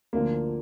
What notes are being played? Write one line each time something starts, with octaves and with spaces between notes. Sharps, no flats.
D2 D3 F3 A#3